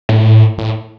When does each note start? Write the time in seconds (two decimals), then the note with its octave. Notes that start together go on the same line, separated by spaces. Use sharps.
0.09 A2
0.58 A2